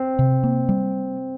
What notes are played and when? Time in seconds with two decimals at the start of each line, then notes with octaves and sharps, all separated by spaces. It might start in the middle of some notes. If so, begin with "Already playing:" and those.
Already playing: C4
0.19 C3
0.43 A#3
0.69 G3